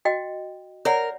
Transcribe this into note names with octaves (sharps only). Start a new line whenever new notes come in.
F#4 D#5 G5
A#4 C#5 D5 F#5